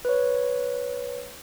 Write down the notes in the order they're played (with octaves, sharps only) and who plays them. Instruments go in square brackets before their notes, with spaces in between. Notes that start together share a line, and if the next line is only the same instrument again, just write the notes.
[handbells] B4 C#5